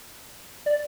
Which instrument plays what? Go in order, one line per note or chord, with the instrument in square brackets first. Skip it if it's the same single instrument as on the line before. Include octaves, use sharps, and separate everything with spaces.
[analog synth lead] D5